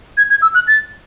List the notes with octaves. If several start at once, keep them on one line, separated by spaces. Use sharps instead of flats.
G#6
G#6
E6
F#6
A6